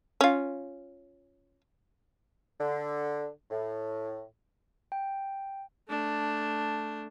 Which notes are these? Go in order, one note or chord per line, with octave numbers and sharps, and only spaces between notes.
C#4 F4
D3
A2
G5
A3 D4